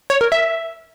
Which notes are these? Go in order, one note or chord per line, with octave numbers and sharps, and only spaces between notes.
C#5
A#4
E5